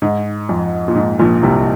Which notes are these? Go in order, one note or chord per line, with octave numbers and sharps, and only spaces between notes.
G#2
F2
A#2
G#2
A#1 A#2
C2 C3